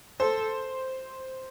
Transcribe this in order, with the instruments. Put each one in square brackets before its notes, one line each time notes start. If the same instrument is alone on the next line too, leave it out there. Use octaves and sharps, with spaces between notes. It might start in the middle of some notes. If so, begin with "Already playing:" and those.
[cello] A4 [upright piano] C5